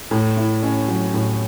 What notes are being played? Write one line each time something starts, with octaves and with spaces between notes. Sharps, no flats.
A2
E4
C#4
F#3
A2